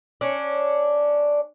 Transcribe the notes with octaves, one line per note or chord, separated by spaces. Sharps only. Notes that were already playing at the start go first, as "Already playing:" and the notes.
C#4 D4